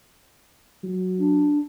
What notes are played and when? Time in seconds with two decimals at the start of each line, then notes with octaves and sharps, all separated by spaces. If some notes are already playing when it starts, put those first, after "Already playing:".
0.83 F#3
1.18 D4